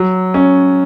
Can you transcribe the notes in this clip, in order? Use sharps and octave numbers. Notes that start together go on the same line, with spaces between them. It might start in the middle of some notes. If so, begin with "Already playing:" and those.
Already playing: F#3
C#4